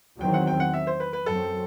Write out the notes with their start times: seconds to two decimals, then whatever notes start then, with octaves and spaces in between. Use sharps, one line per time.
0.21 E2 D#3 F#3 C4 G5
0.34 F#5
0.47 G5
0.60 F#5
0.74 E5
0.87 C5
1.00 B4
1.13 B4
1.26 F#2 F#3 C4 A4